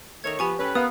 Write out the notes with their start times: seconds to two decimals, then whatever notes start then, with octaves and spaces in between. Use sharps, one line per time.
0.24 D#3 A3 C#5 G#6 F7
0.39 F3 B3 G4 G#5 C#6
0.59 C#4 A4 B4 G5
0.75 B3 A#4 F5 D#6